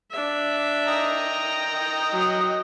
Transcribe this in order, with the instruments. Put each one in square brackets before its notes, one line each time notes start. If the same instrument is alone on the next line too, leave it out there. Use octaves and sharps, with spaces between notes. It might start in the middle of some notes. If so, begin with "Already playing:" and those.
[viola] D4 E5
[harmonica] D#5 G5 A#5
[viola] F#3